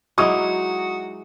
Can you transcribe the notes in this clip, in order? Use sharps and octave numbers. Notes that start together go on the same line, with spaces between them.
F#3 G#3 D#4 E4 F#4 A#5 D6 D#6